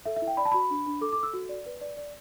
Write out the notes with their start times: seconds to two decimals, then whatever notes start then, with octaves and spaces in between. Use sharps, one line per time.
0.06 A4 E5
0.16 E5
0.22 E4
0.28 G5
0.37 D5 B5
0.45 A5
0.52 F#4 B5
0.70 D4
0.86 D4
1.01 A4 D6
1.13 D6
1.18 A4 E6
1.33 F#4
1.49 D5
1.66 B4
1.81 D5
1.97 D5